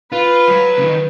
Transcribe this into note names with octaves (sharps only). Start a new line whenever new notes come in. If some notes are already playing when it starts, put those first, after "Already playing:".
F4 B4
F#3
C#3
D#3